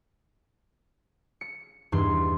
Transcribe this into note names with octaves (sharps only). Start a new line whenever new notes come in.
C#7
E2 G2 D#3 C6